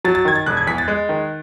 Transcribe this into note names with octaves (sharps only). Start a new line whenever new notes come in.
F#3 A6
A6
D#3 G#6
A6
E1 F#6
G#6
E2 B6
A6
G#3 F#6
D#3